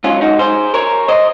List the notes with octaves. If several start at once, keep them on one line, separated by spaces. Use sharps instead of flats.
G#2 F#3 C#4 F4
D#4 F#4
G#4 C5
A#4 C#5
C5 D#5